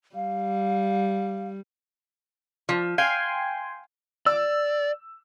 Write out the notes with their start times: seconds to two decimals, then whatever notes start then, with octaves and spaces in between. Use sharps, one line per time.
0.15 G3 F5
2.69 F3
2.98 F5 G5 G#5 C6
4.26 D5 E6